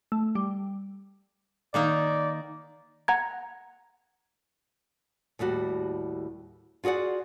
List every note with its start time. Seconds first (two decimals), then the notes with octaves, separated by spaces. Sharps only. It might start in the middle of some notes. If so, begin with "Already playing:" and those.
0.12 A3
0.35 G3
1.74 D#3 A#3 D#4 D5
3.08 F#5 A#5 G#6
5.39 D#2 A2 G3 F#4
6.84 F4 F#4 G#4 D5 F#5